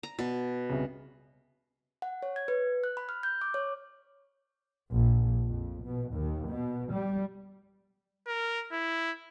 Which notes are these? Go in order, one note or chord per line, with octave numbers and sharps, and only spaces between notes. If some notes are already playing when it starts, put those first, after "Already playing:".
A#5
B2 A6
C2 C#3
F#5
C#5
G#6
B4
F#6
B5
F6
G6
D6
C#5
A#1
F2
B2
D#2
B2
G3
A#4
E4